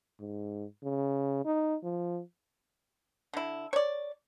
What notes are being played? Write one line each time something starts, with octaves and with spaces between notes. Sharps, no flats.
G#2
C#3
D#4
F3
D3 E4
C#5 D5